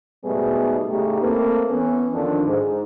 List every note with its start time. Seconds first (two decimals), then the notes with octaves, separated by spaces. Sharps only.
0.25 G#2 B2 G3 A3 B3 G#4
0.88 A2 C#3 A3 D#4 G4
1.22 A3 A#3 C4 A4 B4
1.70 E3 B3 C#4
2.14 F2 D3 D#3 F3 D4
2.46 G#2